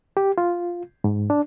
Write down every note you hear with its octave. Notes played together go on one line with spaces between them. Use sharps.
G4
F4
G#2
D4